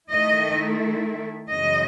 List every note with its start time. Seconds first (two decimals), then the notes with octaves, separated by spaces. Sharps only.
0.10 D#3 A3 E4 D#5
1.51 F#2 C#3 E3 G#3 D#5